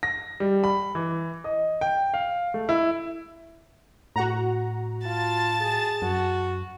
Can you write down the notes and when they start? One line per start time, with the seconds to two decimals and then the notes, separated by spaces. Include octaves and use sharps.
0.03 A#6
0.40 G3
0.64 B5
0.95 E3
1.44 D#5
1.81 G5
2.14 F5
2.54 A3
2.69 E4
4.16 A2 F#4 F#5 A#5
5.06 F4 A5 A6
5.61 G#4
6.02 F#2 F#4